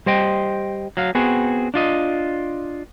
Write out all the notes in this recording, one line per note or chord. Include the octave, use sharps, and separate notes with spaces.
G3 C5 D#5 G5
F#3 F5
B3 C4 F#4 G#4
D4 F4 D#5